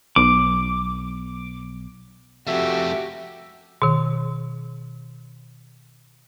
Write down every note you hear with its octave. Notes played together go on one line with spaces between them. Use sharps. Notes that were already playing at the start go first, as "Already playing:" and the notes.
B1 D6
F2 A3 F#4 G4 E5
B2 D#3